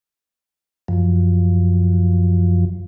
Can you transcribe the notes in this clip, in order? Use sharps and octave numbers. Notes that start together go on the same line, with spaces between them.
F#2 F3